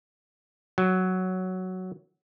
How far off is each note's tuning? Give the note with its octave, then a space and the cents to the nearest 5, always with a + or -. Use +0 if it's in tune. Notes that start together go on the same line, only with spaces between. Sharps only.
F#3 +5